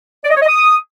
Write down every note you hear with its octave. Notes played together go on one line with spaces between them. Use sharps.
D5
D#5
C#5
D#5
D#6